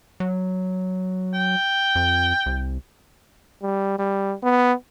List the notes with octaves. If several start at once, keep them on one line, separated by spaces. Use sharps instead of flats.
F#3
G5
F2
C2
G3
G3
B3